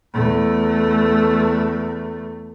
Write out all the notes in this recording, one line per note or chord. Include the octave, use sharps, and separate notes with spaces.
E2 A3